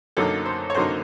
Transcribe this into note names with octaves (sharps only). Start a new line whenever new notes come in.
F#2 D3 F#3 A#3 D#4 A4
C5
C#5
F#2 D3 F#3 A#3 D#4 C5